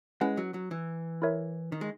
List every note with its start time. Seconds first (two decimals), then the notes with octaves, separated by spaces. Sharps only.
0.21 G#3 C#4 E4 B4 F#5
0.37 F#3
0.54 F#3
0.71 E3
1.22 E4 A#4 C#5 E5
1.72 D#3
1.81 G#3